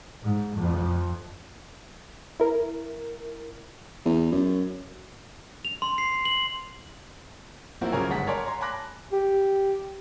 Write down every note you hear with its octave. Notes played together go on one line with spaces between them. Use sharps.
G#2
F2
E4 A#4
E2
F#2
F7
C6
C7
F#7
F3 F#3 A#3 C4 E4 F#4
C2 C#3 F#3 A#4 C#5 G#5
G1 G#2 F#5 A5 B6
A#4 C#5 D5 F#5 G#5 C6
C#5 A#5 C6
G#5 A5 B5 D6 F#6 A#6
G4